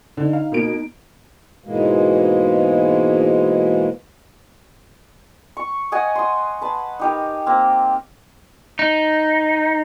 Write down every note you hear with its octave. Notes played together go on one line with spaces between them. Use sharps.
D3 D#4
F5
B2 A#3 D7
G#2 B2 E3 G#3 A#3
C#6
D#5 F#5 G#5 D#6
C6 D#6
B4 A5
D#4 G4 A#4
A#3 C4
D#4